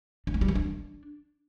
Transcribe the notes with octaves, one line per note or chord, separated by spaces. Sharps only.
D4
A#3
G3
D#3
D4